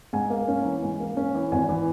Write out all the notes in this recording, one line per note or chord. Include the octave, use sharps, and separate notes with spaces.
G#2 G#5
A#3
C#4
E3
G#2
A#3
C#4
E3
G#1 G#5
E3